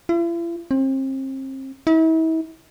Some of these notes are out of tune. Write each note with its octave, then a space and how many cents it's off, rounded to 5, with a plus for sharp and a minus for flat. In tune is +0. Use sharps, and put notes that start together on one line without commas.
E4 +45
C4 +35
E4 -40